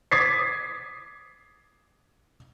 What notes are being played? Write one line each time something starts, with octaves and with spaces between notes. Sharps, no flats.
D6 D#6 G#6 A6 B6 C7